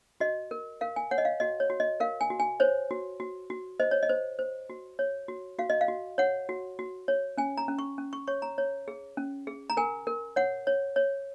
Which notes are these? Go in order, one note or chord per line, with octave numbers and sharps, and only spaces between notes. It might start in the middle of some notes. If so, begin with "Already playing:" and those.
F#4 D#5
A#4
A#4 F5
G#5
C#5 F#5
D#5
F5
F#4 D#5
C#5
F#4
D#5
A#4 F5
G#5
F#4
G#5
C5 C#5
F#4
F#4
F#4
C5 D#5
C#5
D#5
C5
C5
F#4
C#5
F#4
F#4 F5
D#5
F5
F#4
C#5 F#5
F#4
F#4
C#5
C#4 G#5
A#5
C#4
C#6
C#4
C#6
C#5 C#6
A#5
C#5
G#4
C#4
G#4
A#5
A#4 G#5
A#4
C#5 F#5
C#5
C#5